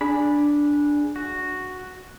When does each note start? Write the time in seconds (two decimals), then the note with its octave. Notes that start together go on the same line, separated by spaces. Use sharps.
0.01 D4 G#4 B5
1.16 F#4